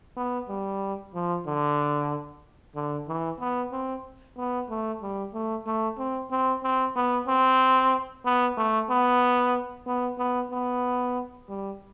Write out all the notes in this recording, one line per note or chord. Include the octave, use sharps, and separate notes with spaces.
B3
G3
F3
D3
D3
E3
B3
C4
B3
A3
G3
A3
A3
C4
C4
C4
B3
C4
B3
A3
B3
B3
B3
B3
G3